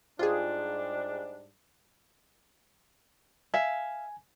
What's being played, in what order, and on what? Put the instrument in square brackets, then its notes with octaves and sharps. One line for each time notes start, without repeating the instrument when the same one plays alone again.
[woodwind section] G#2 G3 D4 [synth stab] F4 G#4
[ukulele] E5 F5 [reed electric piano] G#5